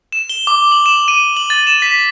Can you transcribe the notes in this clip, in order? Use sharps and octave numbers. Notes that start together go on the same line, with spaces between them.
E7
G7
D6
F#7
E7
D#7
F#7
A6
E7
B6